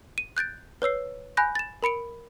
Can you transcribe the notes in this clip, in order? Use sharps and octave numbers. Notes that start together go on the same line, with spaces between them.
D#7
F#6 G6 A6 D7
B4 C#5 E6 C7
G#5 B5 F#6 G6 A#6
A6 E7
A#4 B5 C#7 D7